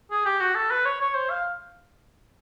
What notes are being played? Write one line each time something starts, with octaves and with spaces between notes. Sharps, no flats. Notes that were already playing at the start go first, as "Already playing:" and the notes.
G#4
G4
F#4
A4
B4
C#5
C#5
C5
F5